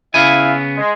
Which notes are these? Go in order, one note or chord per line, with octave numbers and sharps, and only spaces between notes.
C#3 B3 E4 E5 F5 G#5
G#3